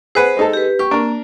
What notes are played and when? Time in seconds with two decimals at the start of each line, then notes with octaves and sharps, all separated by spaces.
0.15 G#4 B4 C5 F#5
0.37 G#3 D#4 A4
0.53 G4 B4
0.79 G4 C#6
0.91 A#3 D4 A#4